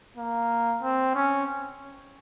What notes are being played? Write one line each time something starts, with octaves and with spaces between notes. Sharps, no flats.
A#3
C4
C#4